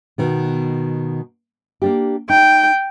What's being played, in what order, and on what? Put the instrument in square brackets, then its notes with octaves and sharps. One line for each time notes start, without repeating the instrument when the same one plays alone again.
[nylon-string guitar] B2 D#3 B3
A#3 D4 G4
[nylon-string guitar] D#4 [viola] G5